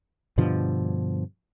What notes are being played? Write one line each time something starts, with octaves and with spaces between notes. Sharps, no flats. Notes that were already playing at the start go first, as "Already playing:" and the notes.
G2 B2 D3 F3